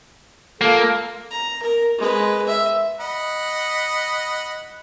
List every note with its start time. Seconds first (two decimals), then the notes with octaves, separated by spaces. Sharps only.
0.61 A#3 F4 A4
1.31 A#5
1.63 A#4
1.98 G#3 B4
2.47 E5
3.00 D#5 F#5 B5